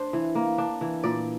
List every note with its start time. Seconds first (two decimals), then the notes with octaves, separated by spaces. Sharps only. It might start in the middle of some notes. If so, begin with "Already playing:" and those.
Already playing: D4 C5
0.13 E3
0.35 A#3
0.58 D4
0.81 E3
1.04 A#2 D5